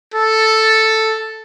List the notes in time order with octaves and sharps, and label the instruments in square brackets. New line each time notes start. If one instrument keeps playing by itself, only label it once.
[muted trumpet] A4